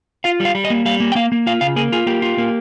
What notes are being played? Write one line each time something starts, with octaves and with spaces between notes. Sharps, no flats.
F4 F5
G3
F5
G3
D#5
A#3
G3 F5
A#3
G5
A#3 F5
A#3
F4 F5
C#3 F5
A#3 G#4
F4 G#4
A#3 G4
F4
A#3